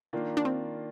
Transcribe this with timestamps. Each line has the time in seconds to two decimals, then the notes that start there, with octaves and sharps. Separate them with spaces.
0.13 D#3 A#3 D4 F4
0.37 D4
0.45 C4